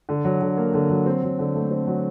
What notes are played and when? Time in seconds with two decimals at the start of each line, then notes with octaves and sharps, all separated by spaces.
0.09 D3
0.25 F#3
0.41 D3
0.57 A#3
0.74 D3
0.89 F#3
1.06 C4
1.23 F#3
1.39 D3
1.55 A3
1.71 C4
1.87 F#3